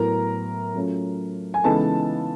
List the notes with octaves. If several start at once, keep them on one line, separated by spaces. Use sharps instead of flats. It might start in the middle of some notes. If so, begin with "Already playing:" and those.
Already playing: A2 F#3 B3 E4 A#4 A#5
F#3 A3 C#4 F4
G#5
C#3 E3 G#3 B3 D#4 A4 A5